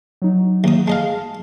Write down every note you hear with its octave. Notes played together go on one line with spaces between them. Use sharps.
F#3 D#4
D#2 D#6
G#3 D#5 F5 A5